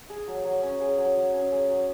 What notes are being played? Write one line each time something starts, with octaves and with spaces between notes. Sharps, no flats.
G#4
F#3
F#3
C#4
G#4
F#3
F#3
C#4
G#4
F#3